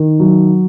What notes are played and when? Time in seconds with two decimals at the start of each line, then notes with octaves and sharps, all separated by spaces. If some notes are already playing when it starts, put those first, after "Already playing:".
Already playing: D#3
0.20 F#3